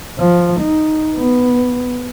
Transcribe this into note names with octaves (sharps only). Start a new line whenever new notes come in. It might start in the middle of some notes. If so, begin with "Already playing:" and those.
F3
D#4
B3